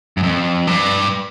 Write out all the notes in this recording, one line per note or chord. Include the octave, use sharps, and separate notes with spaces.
F#2
F2
G2